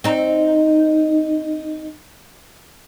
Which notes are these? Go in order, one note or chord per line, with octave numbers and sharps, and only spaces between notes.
C4 D#4